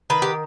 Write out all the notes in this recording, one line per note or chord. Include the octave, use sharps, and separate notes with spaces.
D#3 B4
G4